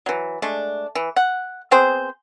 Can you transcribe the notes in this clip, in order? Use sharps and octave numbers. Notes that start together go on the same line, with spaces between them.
E3 F#3
G#3 A3 D4
E3
F#5
B3 C4 G#4 C5